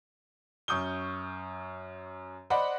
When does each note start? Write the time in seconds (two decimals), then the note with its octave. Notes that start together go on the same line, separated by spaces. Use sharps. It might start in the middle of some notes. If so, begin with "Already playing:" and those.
0.68 F#2 C#6 D#6 G6 G7
2.50 C5 D5 D#5 F#5 B5